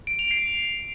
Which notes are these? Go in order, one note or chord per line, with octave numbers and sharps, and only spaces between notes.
D7
F7
C7